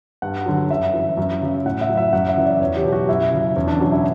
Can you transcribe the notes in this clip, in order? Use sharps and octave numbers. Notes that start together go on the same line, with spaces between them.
G2 F#5
D3 F#3
F#2 E5
E3
F#2
C#3 F#3
A2 F#5
E5
F#3
E5
F#2 F#5
E5
C#3 E3
D5
E2 C#5
G4
B2 F#3
F#4
F#2 E4
C#3 F#3
E2 C#4
D4
B2 F#3 D4
E4